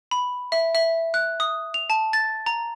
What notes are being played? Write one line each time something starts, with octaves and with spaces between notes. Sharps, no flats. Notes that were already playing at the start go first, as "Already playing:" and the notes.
B5
E5
E5
F#6
D#6
F7
A5
A6
A#5